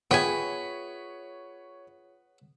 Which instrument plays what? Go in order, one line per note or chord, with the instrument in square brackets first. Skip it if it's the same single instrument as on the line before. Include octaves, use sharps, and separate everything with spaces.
[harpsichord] B3 [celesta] F4 G#4 E5 [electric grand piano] C#5 B6 [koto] G5 G#5